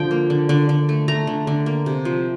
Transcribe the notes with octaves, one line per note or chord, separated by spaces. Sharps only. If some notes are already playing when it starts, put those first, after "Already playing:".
Already playing: D3 F3 G5
A#3
D3
D3
D3
A3
A3 A#5
D3
D3
A#3
C3
F3